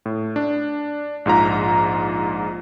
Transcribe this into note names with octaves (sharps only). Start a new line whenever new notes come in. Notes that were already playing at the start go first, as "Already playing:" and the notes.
A2
D4
A#1 G#2 F4 A#5